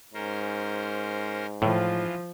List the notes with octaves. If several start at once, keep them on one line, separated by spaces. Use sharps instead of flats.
G#2 C#4 A#4 C5
A2 E3 F3 F4